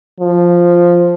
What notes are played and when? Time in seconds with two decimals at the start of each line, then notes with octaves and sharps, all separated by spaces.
0.20 F3